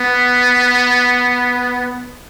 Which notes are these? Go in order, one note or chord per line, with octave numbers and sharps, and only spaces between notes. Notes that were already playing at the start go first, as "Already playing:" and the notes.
Already playing: B3